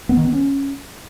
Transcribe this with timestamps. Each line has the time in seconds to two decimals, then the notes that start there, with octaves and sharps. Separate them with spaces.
0.09 B3
0.17 D#3
0.25 B3
0.33 C#4